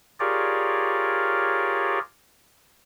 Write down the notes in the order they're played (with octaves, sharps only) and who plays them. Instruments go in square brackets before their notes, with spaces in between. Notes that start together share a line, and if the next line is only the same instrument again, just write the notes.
[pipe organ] F4 G4 G#4 A#4 C#5 D5